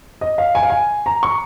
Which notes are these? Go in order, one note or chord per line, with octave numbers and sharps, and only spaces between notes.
D#5
F5
G#5
F5
G#5
A#5
C#6